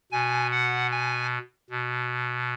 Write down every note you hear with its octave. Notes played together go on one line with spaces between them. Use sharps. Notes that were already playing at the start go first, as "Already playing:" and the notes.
B2 G#5
F#5
G#5
B2